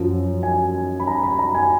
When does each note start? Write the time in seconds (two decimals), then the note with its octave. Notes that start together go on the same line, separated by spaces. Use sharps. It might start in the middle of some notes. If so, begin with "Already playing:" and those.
Already playing: F#2 F3
0.43 G#5
1.00 B5
1.07 A#5
1.23 B5
1.39 A#5
1.55 G#5